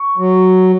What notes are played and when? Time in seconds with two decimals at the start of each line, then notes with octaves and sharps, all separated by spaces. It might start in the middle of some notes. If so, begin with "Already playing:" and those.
Already playing: C#6
0.18 F#3